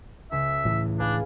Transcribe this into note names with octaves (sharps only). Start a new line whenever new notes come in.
C#2 E5
A2 E3
D4 G#4 B4 F5